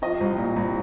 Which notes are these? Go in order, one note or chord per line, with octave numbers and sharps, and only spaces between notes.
F3 D#5
C2
A#2
C2